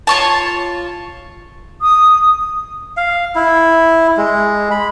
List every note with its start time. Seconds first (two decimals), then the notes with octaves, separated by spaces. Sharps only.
0.07 F4 C#5 A5
1.81 D#6
2.97 F5
3.35 E4
4.17 G#3
4.71 B5